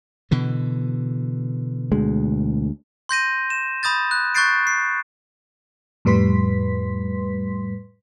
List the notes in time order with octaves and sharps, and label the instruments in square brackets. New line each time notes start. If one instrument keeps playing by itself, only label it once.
[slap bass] B2 D3 E3
[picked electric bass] D2 G#3
[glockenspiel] C6 G6 A#6 D#7
E7
B5 D#6 G6 A6
F#6
C#6 F#6 G6 A6 C7 D7
C7
[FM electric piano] F2 A2 G3 B4 C6 B6